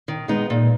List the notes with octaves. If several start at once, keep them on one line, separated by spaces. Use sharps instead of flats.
D#3
G#3 B3 D#4
A#2